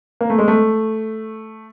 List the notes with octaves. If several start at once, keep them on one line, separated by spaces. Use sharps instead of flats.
A#3
A3
G#3
A3